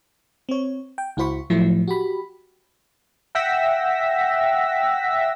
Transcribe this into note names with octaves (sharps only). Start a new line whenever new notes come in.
C4 C#5
G5
C#2 E4 F#4 C5 B5 C#6
A2 F3 F#3 A3 E4
F#4 G4 B5
E5 F#5 G5 E6 A#6 B6